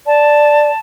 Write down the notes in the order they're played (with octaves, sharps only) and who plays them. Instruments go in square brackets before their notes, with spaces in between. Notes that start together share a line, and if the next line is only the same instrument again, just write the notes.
[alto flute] D5 [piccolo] A5